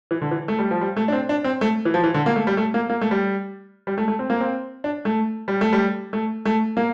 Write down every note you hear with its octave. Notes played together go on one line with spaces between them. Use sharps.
E3
D3
E3
A3
G3
F3
G3
A3
D4
C4
D4
C4
A3
E3
F3
E3
D3
A#3
A3
G3
A3
A#3
A#3
A3
G3
G3
A3
A3
C4
A#3
C4
D4
A3
G3
A3
G3
A3
A3
A#3